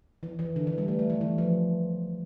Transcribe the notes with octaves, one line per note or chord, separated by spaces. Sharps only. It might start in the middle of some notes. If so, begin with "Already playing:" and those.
E3
E3
D3
E3
G3
A3
A3
E3
E3
F3